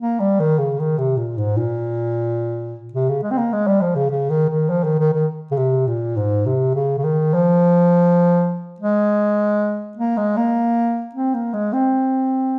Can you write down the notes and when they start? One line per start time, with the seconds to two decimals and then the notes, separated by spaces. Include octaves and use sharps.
0.01 A#3
0.20 G3
0.40 D#3
0.59 C#3
0.79 D#3
0.98 C3
1.17 A#2
1.38 G#2
1.57 A#2
2.94 C3
3.09 C#3
3.23 G#3
3.31 C4
3.38 A#3
3.53 G#3
3.67 G3
3.81 F3
3.96 C#3
4.10 C#3
4.30 D#3
4.50 D#3
4.70 F3
4.84 D#3
4.99 D#3
5.14 D#3
5.51 C#3
5.57 C3
5.87 A#2
6.16 G#2
6.46 C3
6.75 C#3
6.98 C#3
7.04 D#3
7.34 F3
8.80 G#3
9.97 A#3
10.17 G#3
10.37 A#3
11.15 C4
11.34 A#3
11.53 G#3
11.73 C4